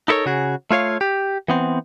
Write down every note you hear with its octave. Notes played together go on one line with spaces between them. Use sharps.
D#4 E4 A4 A#4 C#5
C#3 F#4 G#4
A3 F4 C#5 F5
G4
E3 B3 C4